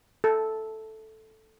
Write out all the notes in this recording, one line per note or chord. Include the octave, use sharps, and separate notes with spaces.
A4